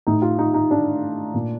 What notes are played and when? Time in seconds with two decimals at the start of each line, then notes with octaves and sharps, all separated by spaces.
0.07 A2 D#4
0.22 F4
0.39 D#4
0.54 D#4
0.71 D4
1.34 A#2